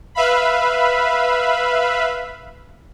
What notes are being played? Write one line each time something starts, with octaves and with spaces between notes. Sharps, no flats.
B4 E5 F5 B5